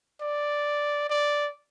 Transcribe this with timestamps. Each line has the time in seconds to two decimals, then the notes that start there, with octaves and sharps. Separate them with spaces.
0.21 D5
1.10 D5